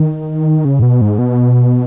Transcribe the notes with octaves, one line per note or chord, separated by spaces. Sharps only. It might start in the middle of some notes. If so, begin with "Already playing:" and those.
Already playing: D#3
C#3
G#2
B2
G#2
B2